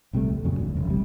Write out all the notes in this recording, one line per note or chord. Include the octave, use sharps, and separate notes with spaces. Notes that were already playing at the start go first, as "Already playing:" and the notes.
A#1 C3 G3 A3
C#2
F2 A#2 C#3 F#3
F1 D2 D3
E1 C#2
A#1 C3 G3